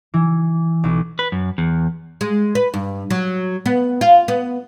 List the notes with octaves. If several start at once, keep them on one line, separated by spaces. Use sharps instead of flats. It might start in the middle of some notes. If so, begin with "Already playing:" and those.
E3
B1
B4
F#2
E2
G#3
B4
G2
F#3
B3
F4
B3